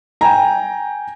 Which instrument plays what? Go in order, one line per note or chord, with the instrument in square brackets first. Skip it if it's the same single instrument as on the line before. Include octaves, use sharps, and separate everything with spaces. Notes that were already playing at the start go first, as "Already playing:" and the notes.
[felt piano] G5 G#5 A#5